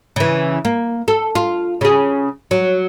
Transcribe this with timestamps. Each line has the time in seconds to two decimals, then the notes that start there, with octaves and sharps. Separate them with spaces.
0.16 C#3 E3
0.65 A#3
1.08 A4
1.35 F4
1.81 C#3 G#4
2.51 F#3